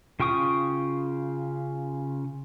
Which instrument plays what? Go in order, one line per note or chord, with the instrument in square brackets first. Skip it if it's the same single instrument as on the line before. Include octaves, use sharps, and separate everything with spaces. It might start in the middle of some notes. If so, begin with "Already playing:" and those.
[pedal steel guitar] C#3 F4 G5 C#6 D#6